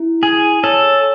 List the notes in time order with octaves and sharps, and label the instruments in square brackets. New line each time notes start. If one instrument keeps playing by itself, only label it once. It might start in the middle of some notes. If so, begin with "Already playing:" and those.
Already playing: [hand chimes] E4
[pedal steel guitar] G#4 [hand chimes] G#5
[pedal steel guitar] A4 [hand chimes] C#5